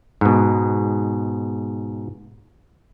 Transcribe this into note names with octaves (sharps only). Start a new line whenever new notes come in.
G#2 B2